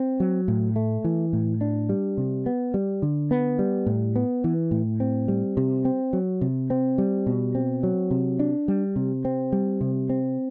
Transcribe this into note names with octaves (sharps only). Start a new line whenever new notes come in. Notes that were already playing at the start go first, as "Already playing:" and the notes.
Already playing: C4
F#3
A2
A3
E3
A2
D4
G3
C3
B3
G3
D3
B3
G3
A2
B3
E3
A2
C4
G3
C3
C4
F#3
C3
C4
G3
B2
C4
F#3
C3
D4
G3
C3
C4
G3
C3
C4